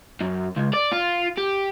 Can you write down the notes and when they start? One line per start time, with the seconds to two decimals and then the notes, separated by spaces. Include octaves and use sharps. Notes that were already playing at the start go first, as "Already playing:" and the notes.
0.21 F#2
0.57 C#2
0.74 D5
0.93 F4
1.38 G4